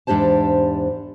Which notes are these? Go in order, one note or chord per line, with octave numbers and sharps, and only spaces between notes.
E2 G#2 D4 G4 C5 A5